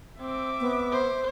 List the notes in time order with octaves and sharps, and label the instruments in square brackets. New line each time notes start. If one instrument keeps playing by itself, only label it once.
[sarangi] C4 [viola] E5 D6
[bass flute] B3
[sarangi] C5